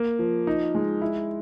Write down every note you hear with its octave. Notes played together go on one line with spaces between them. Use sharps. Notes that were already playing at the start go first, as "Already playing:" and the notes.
Already playing: A#3
F3
D#4
G#3
E4